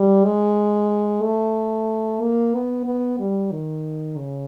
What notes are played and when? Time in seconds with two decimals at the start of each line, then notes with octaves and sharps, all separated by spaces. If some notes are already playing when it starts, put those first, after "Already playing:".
Already playing: G3
0.25 G#3
1.23 A3
2.21 A#3
2.54 B3
2.86 B3
3.19 G3
3.51 D#3
4.17 C#3